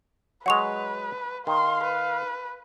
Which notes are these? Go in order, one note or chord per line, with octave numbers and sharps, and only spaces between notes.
F#3 G#3 B4 F#5 C#6 F7
D#3 F5 C6
B4